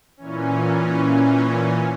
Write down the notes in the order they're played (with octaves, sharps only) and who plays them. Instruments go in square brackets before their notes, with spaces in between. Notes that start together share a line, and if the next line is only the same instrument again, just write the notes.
[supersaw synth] A#2 E3 C#4